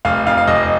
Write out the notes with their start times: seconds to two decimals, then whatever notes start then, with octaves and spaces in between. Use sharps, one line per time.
0.05 F1 F5
0.27 F2 F5
0.37 F5
0.48 F1 D#5